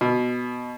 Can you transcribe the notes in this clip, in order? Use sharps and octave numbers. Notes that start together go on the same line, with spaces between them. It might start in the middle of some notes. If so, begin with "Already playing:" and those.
B2